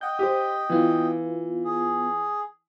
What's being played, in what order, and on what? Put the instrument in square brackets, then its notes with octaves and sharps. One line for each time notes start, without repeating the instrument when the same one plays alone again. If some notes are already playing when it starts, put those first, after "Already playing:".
[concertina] D#5 G5 [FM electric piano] F#5 G6
[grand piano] G4 [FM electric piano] C5 D#6
[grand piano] E3 [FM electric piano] B3 F4
[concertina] G#4